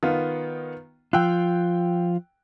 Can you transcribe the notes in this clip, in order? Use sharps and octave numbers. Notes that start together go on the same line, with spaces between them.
D#3 B3 F4
F3 F4 G5 E6 F#6